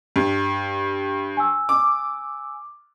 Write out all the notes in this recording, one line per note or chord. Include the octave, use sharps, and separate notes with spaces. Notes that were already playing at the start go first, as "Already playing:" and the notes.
G2
G#5 E6
D6